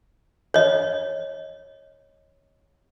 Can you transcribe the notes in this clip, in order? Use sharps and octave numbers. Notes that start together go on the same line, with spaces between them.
C#5 D#5